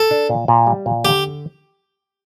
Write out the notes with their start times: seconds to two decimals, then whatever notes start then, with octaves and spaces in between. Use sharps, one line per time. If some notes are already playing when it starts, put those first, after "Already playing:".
Already playing: A4
0.11 D4
0.29 A#2
0.48 A#2
0.67 G3
0.86 A#2
1.04 D3 G4